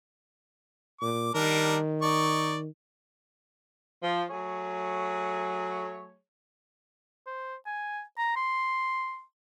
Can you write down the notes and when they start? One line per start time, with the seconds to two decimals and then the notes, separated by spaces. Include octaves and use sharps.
1.01 A#2 D6
1.34 D#3 G3 D4 A#4
2.02 D#4 D5 C#6
4.02 F3
4.30 F#3 A3 G#4 C#5
7.26 C5
7.66 G#5
8.18 A#5
8.36 C6